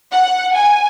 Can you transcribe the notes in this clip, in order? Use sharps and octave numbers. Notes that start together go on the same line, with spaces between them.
F#5
G#5